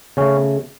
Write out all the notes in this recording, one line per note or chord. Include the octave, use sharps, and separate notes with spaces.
C#3 A3 C#4